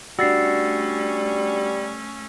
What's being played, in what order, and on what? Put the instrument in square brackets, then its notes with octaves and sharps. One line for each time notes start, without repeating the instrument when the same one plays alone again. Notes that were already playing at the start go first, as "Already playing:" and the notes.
[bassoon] G3 [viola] A3 C#4 [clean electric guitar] D4 F#4 [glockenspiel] E6 A6 C7